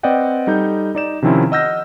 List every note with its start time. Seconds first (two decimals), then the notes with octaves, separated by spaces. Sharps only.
0.03 C4 B4 D5 D#5 F#5 G5
0.47 G3 D#4 A4 G6
0.95 D#4 D5 E7
1.22 C3 D#3 F3 C4 C#4 E4
1.52 D#5 F#5 E6 F6 G6 A#6